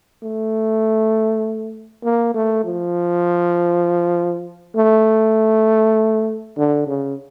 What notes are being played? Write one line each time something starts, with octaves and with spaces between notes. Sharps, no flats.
A3
A#3
A3
F3
A3
D3
C#3